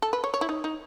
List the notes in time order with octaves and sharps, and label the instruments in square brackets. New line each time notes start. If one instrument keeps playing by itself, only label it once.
[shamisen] A4
B4
C#5
C#5
E4
D#4
D#4